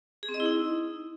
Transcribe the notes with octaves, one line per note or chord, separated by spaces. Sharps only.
G#4
C4
D#5
E4
D#4